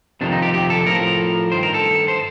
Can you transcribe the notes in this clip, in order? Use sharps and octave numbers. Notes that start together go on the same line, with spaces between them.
F2 C3 D#3 D4
D#4
G4
G4
A4
A2 F3 A#4
G2 D#3 C5
A#4
A4
C5